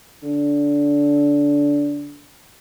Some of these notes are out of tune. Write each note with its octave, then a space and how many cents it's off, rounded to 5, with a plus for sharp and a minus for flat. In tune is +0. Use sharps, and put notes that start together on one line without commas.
D3 -20